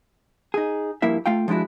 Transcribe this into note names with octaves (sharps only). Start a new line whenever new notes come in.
D#4 G#4
G2 F3 A#3 E4 E5
A3 F4 F5 G5
F3 G#3 D4 E4 F#4